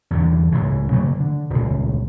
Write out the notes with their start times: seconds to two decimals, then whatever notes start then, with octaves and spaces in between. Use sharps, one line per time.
0.11 E2 G2 D3
0.52 C#2 A2 C#3
0.92 C#3 F#3 A3 A#3
1.20 D3
1.50 D#1 C#2